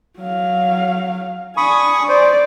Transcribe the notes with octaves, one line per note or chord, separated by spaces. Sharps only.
F#3 F5
D4 G#5 B5 C#6 D#6
C5 D5